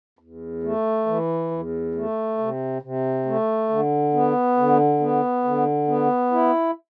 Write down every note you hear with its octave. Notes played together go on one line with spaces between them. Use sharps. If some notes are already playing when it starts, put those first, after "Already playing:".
E2
A3
E3
E2
A3
C3
C3
A3
D3
B3
D3
B3
D3
B3
E4